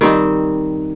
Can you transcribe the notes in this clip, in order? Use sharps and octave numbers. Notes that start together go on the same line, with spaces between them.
D#3 G3 C4 D#4